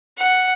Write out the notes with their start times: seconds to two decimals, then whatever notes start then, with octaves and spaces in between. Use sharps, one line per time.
0.18 F#5